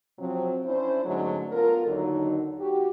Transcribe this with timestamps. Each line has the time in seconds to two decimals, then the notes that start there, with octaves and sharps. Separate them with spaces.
0.19 C3 F3 F#3 C4
0.65 C#4 D4 E4 C5
1.06 G#2 D3 F#3 G#3 A3 C#4
1.51 B3 F4 A4 A#4
1.86 D#2 D3 F#3 D#4
2.59 F#4 G4